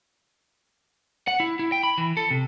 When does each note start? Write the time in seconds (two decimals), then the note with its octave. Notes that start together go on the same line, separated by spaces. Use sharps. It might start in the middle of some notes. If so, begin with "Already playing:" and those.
1.28 F#5
1.40 E4
1.59 E4
1.72 G5
1.83 B5
1.98 E3
2.17 A4
2.31 C3